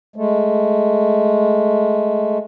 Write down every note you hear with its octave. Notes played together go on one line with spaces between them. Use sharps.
G#3 A3